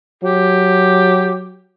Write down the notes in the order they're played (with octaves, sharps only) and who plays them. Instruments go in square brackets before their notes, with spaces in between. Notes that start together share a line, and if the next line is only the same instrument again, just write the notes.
[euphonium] F#3 [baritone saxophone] G4